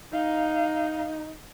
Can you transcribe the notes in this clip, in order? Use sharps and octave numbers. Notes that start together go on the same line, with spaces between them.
D#4 F5